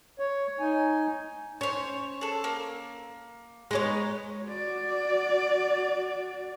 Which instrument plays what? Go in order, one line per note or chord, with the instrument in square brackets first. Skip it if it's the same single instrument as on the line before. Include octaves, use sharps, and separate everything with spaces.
[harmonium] C#5
D#4 G#5
[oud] C#4 [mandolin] C5 C#5
[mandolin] G#4 A4
A#3
[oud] G#3 C#5 [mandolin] B3 C4 D#4
[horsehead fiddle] F#4 D5